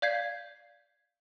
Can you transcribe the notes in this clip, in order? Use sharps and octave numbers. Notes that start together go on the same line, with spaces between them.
D5 F5 G6 G#6 B6 C7